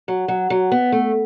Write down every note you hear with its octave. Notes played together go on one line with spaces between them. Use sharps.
F#3
F#3
F#3
B3
A3